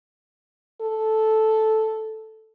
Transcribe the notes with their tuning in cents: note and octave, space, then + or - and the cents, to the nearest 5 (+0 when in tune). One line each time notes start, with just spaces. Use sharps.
A4 -5